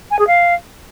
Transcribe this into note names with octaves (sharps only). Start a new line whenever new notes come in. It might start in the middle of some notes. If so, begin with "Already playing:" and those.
G#5
G#4
F5